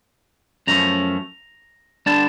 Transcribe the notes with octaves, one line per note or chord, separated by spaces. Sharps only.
F#2 C#3 F3 A3 C#4 A#5
D3 G3 B3 D4 A5